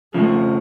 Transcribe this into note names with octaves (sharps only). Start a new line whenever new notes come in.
F2 C#3 F3 A3